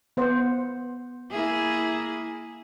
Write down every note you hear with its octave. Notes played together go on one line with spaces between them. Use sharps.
B3 C5 F#5
A#3 E4 G#4